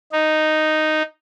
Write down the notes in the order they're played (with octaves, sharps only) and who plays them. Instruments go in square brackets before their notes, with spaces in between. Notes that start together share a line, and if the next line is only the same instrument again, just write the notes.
[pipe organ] D#4